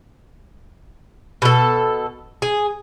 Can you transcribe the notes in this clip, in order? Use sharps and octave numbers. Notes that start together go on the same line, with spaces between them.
B2 A4
G#4